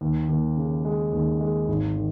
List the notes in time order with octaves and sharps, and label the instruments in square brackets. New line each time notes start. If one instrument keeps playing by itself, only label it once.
[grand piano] D#2
D#2
C#3
G#3
D#2
G#3
G#1
D#3